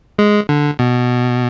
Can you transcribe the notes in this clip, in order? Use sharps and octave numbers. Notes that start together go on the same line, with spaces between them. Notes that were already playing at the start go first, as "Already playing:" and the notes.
G#3
D3
B2